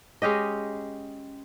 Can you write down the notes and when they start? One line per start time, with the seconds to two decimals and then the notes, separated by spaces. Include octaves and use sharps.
0.22 G#3 C#4 G4 D#5